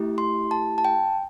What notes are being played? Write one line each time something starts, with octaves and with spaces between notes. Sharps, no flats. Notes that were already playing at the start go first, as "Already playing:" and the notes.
Already playing: A3 E4 G4
C6
A5
A5
G5